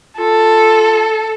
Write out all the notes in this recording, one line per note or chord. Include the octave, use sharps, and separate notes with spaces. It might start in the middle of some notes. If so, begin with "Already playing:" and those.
F4 A4